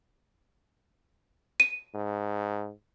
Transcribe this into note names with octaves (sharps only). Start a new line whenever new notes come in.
D#7
G#2